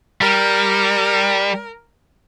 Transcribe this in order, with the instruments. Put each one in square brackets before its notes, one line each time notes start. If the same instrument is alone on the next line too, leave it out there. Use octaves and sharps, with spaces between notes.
[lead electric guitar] G3 [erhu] A#4